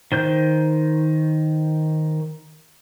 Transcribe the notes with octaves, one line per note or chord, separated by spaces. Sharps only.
D#3 C5 G6